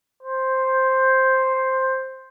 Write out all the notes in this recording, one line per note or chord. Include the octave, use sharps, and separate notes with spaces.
C5